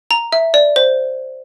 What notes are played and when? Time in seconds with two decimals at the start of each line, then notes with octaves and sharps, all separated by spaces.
0.11 A#5
0.33 E5
0.54 D5
0.76 C5